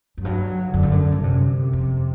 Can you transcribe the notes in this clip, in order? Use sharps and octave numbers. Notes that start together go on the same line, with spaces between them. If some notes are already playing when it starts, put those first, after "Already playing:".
F#2
G2 F#3
F#2 D3
G2
F#2
G2
F#2 C3
F2